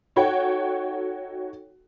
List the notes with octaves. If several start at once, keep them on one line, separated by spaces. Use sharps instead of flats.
D#4 F#4 A4 C#5 F#5 G5